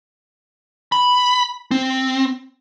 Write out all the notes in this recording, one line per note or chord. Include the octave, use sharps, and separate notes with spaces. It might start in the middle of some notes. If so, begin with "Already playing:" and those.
B5
C4